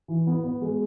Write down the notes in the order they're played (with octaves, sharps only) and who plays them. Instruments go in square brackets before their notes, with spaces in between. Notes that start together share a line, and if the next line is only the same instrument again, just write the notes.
[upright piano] E3
B3
B3
G#3